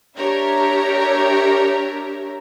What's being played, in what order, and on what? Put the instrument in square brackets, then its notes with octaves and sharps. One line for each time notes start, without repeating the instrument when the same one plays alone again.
[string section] D4 G4 A#4 C#5 E5 A#5